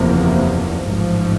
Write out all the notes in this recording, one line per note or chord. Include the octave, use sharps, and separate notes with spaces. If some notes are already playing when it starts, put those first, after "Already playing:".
Already playing: F#1 E2 C3 F3 A#3
A1 G#2 F3